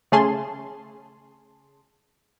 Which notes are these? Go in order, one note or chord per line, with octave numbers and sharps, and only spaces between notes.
C#3 A3 C#4 G#4 A5 C6